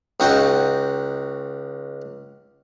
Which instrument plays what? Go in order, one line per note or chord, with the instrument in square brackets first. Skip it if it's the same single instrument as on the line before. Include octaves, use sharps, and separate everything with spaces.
[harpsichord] C#2 D#4 F#4 G5